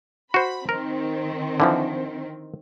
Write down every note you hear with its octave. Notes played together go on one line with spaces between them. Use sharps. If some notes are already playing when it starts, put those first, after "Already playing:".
F#4 C5 B5
D#3 C4 A#4
D3 E3 F3